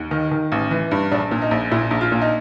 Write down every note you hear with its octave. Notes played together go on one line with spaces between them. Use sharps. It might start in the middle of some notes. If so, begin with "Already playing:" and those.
Already playing: D#2
D#3
D#3
A1
E3
G2
A#1 D4
A#2
D#4
A#1
A#2 E4
A#1
F4
A#2
D#4